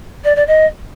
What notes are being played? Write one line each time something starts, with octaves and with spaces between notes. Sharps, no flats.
D5
D5
D#5